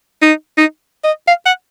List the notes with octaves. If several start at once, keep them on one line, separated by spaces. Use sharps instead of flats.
D#4
D#4
D#5
F5
F#5